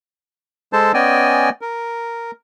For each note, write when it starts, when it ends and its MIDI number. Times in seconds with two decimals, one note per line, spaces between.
0.73 0.92 56
0.73 0.92 69
0.73 0.92 72
0.73 0.92 81
0.94 1.50 59
0.94 1.50 61
0.94 1.50 74
0.94 1.50 75
0.94 1.50 79
0.94 1.50 80
1.61 2.31 70